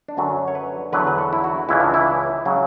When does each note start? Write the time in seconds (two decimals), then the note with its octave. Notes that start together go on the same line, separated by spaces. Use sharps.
0.08 D4
0.17 F#2 D3 F#3 C#4
0.48 C#5
0.55 B4
0.92 E2 D3 F#3 B4
1.07 B4
1.18 A4
1.33 E4
1.44 F#4
1.69 C#2 C#3 E3 E4
1.81 D4
1.94 E4
2.46 C#3 F#3